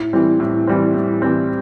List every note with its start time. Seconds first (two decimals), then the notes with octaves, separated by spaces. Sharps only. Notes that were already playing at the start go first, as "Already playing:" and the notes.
Already playing: A2
0.13 E3 G3 C4
0.40 A2
0.67 E3 G3 C4
0.94 A2
1.22 E3 G3 C4